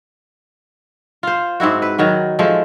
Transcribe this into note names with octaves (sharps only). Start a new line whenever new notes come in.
F4 C5
G#2 C4 E4 F#4
B4
D#3 F#3 F#4
F3 G#3 A3